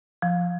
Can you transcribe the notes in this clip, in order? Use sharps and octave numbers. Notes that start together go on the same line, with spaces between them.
F3